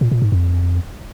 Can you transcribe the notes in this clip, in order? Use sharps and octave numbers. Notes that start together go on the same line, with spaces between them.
A#2
A#2
G#2
F2